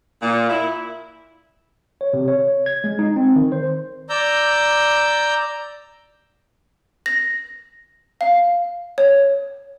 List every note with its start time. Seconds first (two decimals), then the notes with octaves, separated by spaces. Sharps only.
0.21 A#2
0.48 E4
2.01 C#5
2.13 C3
2.28 C#5
2.66 G#6
2.84 G#3
2.99 D#4
3.16 C4
3.36 D#3
3.52 C5
4.10 D5 A#5 E6 G6
7.06 A#6
8.21 F5
8.98 C#5